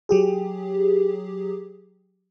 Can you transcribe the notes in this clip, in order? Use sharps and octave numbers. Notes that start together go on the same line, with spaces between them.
F#3 G4 G#4